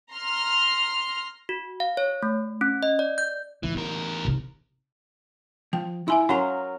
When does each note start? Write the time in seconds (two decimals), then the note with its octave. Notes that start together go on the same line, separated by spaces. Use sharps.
0.12 A#5 C6 F6
1.49 F#4
1.80 F5
1.97 C#5
2.23 A3
2.61 C#4
2.83 D#5
2.99 D5
3.18 G6
3.63 G2 E3 F#3
3.75 E2 D#4 A#4
4.25 C3 D#4
5.73 F3 G5
6.08 E4 E5 G#5 C6
6.29 F#3 C#4 A#4 F5 A#5 C6